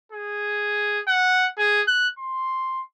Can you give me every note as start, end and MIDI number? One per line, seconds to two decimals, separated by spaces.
0.12 1.01 68
1.08 1.48 78
1.58 1.82 68
1.88 2.08 90
2.19 2.82 84